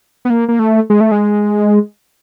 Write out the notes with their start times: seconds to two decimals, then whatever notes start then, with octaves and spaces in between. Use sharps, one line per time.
0.25 B3
0.30 A#3
0.48 A#3
0.59 A3
0.90 G#3
1.01 A3
1.12 G#3